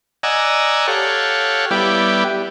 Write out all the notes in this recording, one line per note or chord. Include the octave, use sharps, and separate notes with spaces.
D5 D#5 F#5 G#5 A#5 E6
G4 A4 C#5 F5 F#5
G3 B3 E4 G4 D5